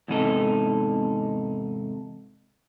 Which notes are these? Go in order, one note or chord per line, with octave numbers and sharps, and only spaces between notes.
E2 G#2 C3 D#4 A4